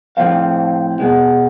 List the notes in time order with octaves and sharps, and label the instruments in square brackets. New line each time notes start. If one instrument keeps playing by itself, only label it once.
[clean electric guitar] A2 F3 A3 C4 F5
B2 G#3 B3